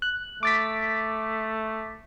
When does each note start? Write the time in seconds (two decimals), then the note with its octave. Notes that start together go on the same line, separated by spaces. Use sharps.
0.02 F#6
0.43 A3 D6 A6 B6